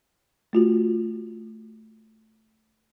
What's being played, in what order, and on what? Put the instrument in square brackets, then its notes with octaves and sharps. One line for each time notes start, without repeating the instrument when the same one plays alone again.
[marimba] A3 F4 F#4